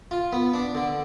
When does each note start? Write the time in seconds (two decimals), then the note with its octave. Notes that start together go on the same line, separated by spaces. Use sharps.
0.11 F4
0.33 B3
0.53 D4
0.75 D3